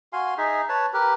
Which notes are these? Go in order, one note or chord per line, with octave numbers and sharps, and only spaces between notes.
F#4 F5 G#5 C6
D#4 G#4 E5
B4 C#5 A5
G4 A#4 B4